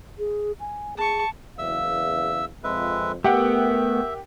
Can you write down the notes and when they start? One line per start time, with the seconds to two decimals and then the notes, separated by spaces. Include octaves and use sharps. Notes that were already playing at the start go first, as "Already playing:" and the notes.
0.19 G#4
0.60 G#5
0.97 G#4 A5 C#6
1.58 F#1 E2 E5 F5 E6
2.64 F2 G#3 B4 E5
3.24 A3 B3 G4 A#4 E5 F#5 G5